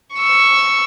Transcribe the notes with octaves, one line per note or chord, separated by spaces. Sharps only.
C#6 E6